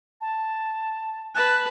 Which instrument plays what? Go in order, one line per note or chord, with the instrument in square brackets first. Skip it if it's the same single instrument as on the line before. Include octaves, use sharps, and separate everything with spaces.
[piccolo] A5
[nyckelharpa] B4 A5 [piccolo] F#6